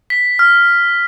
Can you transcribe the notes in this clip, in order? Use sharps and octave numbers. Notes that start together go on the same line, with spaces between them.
B6
F6